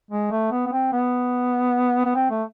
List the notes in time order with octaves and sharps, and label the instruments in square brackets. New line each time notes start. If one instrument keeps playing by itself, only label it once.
[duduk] G#3
A3
B3
B3
C4
B3
B3
C4
A3